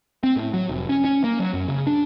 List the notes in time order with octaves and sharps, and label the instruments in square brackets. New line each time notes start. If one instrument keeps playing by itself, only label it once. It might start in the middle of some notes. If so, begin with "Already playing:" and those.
[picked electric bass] C4
A2
F#3
F1
C#4
C#4
A#3
F#3
F#2
C#3
D4